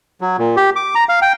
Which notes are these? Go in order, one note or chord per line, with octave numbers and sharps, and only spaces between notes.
F#3
A#2
G4
D6
A#5
F5
G5